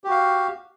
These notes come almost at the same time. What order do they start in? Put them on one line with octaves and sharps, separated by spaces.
G4 F#4 F5